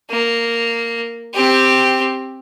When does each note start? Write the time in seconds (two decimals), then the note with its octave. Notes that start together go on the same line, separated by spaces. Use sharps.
0.10 A#3
1.34 C4 G4